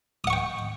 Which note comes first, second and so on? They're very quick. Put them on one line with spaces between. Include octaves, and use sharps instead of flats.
D#6 F#5 C#6 G5